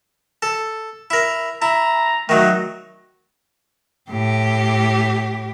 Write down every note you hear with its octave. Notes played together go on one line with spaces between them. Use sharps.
A4
E4 A#4
E4 A#5
D#3 F#3 A3
A2 G4